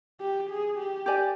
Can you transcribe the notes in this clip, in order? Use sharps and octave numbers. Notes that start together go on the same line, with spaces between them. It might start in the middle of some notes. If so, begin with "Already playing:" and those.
G4
G#4
G4
G4 D5 G#5